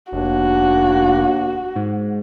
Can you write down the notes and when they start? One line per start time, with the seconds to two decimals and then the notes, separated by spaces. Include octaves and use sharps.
0.12 F1 D#2 A#3 D4 F#4
1.76 G#2